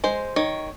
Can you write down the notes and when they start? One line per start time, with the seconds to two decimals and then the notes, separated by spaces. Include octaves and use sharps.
0.04 G#3 C5
0.36 D#3 C#5